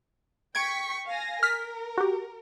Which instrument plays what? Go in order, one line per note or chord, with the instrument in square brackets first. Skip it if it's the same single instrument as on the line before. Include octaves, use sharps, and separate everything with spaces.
[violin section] G5 C#6 B6 [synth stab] G#6 D7
[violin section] F5 G#5 A#6
[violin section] A#4 [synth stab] F6 B6
[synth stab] F#4 G4